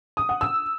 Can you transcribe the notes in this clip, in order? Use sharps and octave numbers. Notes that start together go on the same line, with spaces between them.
D#6
F#5
E6